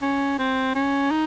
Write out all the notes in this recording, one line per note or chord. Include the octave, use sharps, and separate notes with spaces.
C#4
C4
C#4
D#4